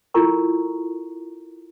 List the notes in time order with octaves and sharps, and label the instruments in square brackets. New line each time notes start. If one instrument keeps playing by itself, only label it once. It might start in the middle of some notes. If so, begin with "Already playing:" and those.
[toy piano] E4 F4 A4 A#4 A#5 C#6